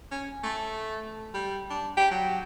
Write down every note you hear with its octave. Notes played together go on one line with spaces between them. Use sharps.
C#4
A3
G3
D4
G4
F#3